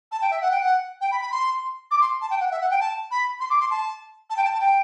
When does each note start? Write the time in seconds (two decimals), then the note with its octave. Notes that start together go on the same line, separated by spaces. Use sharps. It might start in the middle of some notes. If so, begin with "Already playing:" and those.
0.12 A5
0.22 G5
0.31 E5
0.41 F#5
0.51 G5
0.60 F#5
1.01 G5
1.11 B5
1.21 B5
1.31 C6
1.91 D6
2.01 C6
2.21 A5
2.30 G5
2.40 F#5
2.51 E5
2.61 F#5
2.71 G5
2.80 A5
3.11 B5
3.40 C6
3.50 D6
3.61 C6
3.71 A5
4.30 A5
4.37 G5
4.44 A5
4.55 A5
4.60 G5